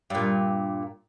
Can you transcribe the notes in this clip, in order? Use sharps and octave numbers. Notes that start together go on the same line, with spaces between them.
G2 A#2